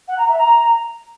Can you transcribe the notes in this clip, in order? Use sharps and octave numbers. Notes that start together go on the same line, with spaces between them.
F#5
A#5
E5
A#5